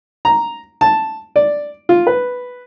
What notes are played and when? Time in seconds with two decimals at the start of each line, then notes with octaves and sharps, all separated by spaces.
0.25 A#5
0.81 A5
1.36 D5
1.89 F4
2.07 B4